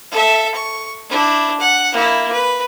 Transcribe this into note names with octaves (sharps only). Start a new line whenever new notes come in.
A4 E5
C#6
D4 E4
F#5
A#3 E4
B4